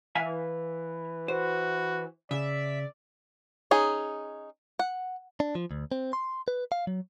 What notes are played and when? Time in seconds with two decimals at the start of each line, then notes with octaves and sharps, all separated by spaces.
0.15 E3 E5 F5 G#5
1.28 F#4 C5
2.31 C#3 D5 E5
3.71 C#4 D#4 G#4
4.79 F#5
5.40 D4
5.55 F3
5.71 D2
5.92 C4
6.13 C6
6.48 B4
6.72 F5
6.87 F#3